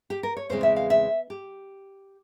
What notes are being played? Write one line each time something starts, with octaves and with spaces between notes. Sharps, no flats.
G4
A#4
C#5
E2 C#3 E3 G#3 C4 C5
E5
F5
E5
G4